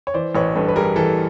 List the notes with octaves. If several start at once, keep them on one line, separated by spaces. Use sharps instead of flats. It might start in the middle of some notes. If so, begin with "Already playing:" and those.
C#5
E3 C5 D5
A1 B4 C#5
G2 A4 B4
B4
G3 G#4 A#4
E3 A4